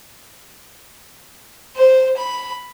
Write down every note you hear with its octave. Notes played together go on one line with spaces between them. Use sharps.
C5
B5